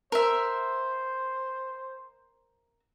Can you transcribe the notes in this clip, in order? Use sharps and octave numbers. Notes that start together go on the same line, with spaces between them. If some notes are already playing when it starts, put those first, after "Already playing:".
A#4 C5 E5